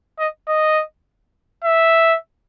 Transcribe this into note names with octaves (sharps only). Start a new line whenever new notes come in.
D#5
D#5
E5